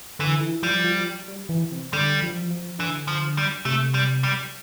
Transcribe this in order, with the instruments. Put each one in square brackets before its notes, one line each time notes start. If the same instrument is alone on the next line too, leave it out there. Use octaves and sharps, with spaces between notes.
[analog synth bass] D3 [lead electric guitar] E3
[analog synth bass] E3
[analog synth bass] F3 [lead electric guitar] G3
[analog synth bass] F3
G3
E3
C3
[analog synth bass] D3 [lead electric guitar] G3
[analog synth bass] F3
F3
[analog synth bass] D3 [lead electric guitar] E3
[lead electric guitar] F3
G3
[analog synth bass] C3 [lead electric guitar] A3
[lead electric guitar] G3
G3